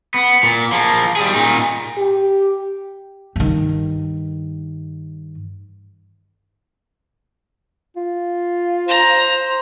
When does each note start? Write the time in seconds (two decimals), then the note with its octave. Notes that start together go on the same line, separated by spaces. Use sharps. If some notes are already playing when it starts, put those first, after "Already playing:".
0.14 B3
0.43 A#2
0.72 F3 A#3
1.16 G3 G#4
1.34 A#2 D#4
1.97 G4
3.36 G2 D#3
7.97 F4
8.89 C5 A#5